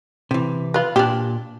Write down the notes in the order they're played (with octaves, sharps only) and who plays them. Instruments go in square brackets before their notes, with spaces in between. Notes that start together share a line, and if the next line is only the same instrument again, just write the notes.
[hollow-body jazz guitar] C3 E3
[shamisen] F4 B4
[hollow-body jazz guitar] A#2 [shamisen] D4 G4